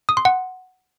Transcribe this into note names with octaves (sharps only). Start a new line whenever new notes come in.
D#6
C6
F#5